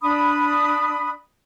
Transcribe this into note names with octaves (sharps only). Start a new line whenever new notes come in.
D4 B5 D#6